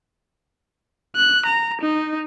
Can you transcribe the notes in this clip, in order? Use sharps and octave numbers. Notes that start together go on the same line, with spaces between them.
F#6
A#5
D#4